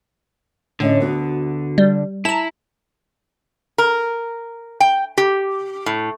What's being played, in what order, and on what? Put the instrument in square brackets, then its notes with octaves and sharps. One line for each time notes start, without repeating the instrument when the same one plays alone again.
[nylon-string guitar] A2 C#4 D#5 [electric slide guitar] D3
[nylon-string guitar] D2 B3 F#4
[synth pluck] G3
[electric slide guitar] E4 [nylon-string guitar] A5 [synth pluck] A#5 E7
[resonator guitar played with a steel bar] A#4
G5
G4
A2